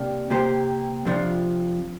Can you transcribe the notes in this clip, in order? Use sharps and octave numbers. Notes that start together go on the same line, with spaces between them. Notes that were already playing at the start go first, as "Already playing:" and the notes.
Already playing: C3 A#3 D4 G4
C3 A#3 G4 C5
F2 C3 F3 D4 F4